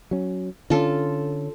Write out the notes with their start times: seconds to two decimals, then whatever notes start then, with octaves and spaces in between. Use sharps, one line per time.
0.11 F#3 C#4
0.70 D3 C#4 F4 A4